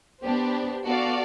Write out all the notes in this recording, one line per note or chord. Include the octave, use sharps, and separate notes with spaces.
B3 D4 G4 C5
B3 F#4 A4 D5 F5